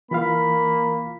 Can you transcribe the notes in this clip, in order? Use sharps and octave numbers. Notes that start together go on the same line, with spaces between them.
E3 A#3 F4 F5 B5